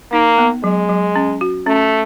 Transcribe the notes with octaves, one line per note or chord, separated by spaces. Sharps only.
A#3 D#4
B3
F#3 G#3
F#3
C#4
F#4
A3 C#4